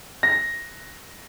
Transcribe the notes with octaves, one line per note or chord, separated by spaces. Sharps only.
A#6